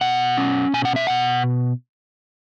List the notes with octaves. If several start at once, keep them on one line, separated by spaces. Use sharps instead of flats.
B2 F#5
C#4
B2 G#5
F#5
E5
B2 F#5